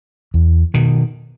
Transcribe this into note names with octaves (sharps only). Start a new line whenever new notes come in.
E2
B2 D#3